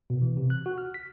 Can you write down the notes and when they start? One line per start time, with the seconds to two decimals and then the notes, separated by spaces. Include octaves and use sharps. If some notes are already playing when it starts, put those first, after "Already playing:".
0.10 B2
0.22 E3
0.37 C3
0.50 F#6
0.66 F#4
0.78 F6
0.94 B6